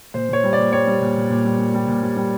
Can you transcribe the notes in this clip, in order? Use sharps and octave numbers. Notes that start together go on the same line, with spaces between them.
A#2 C5
A#2 C#5
G3
D5
A#2
G3 C#5
G3
A#2
A#2
A#2
G3
A#2
G3
A#2
G3
G3